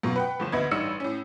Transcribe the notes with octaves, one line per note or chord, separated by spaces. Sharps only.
F#2 B2 F4
B4 F#5 G5
G1 F3 E7
D2 B3 D#5 E5 B5 G#6
A1 G2 G3 D#4 E6 C#7
A2 C#4